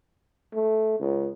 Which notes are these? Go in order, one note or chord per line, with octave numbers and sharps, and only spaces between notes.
A3
C#2